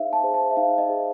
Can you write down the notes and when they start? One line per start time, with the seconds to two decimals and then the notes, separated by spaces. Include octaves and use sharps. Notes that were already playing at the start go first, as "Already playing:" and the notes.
Already playing: D#4 G#4 C5 E5 F5
0.13 A5
0.24 G#4 C5
0.34 A5
0.51 E5
0.57 D#4 F5
0.78 D#5
0.89 G#4 C5